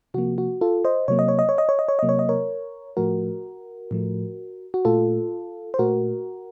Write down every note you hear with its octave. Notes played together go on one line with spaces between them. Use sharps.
C3 F3 A#3 F#4
F#4
F4 A4
C5 D#5
C3 F#3 A#3 C#5
D#5
C#5
D#5
C#5
D#5
C#5
D#5
C#5
C3 F#3 A#3 D#5
C#5
D#5
A#4 C#5
A2 F3 A3 F#4 A#4
A2 F3 A3
F#4
A#2 A3 F4 A4
C5
A#2 A3 F#4 A#4